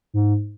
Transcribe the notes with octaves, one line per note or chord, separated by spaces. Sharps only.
G#2